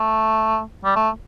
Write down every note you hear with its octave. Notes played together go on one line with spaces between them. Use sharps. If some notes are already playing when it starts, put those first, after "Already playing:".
Already playing: A3
G3
A3